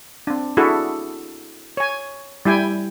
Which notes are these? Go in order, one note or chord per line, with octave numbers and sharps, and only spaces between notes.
C4 D4
D4 E4 F#4 G#4 A4 E5
C#5 G#5
G3 E4 G5 G#5